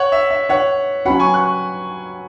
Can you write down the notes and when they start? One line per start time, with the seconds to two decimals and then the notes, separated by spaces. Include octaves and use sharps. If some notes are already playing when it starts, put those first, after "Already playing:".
Already playing: C#5 F#5
0.12 E5
0.30 E5
0.49 C#5 F#5
1.05 F#3 C#4 F#4 F#5 B5
1.20 G#5 C#6
1.34 C#6 F#6